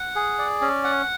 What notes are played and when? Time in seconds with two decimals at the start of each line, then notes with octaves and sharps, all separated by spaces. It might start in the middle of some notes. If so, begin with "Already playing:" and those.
Already playing: F#5
0.15 G#4
0.39 D5
0.61 C#4
0.84 F#5